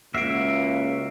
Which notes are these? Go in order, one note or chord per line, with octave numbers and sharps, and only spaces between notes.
C#2 A#3 F#4 E5 C7 D7